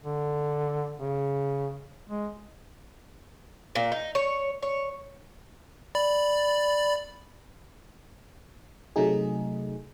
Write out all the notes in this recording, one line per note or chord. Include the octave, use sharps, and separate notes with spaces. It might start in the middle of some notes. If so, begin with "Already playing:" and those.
D3
C#3
G#3
A#2
D#4
C#5
C#5
D5 B5
C3 F#3 A3 D#4 G#4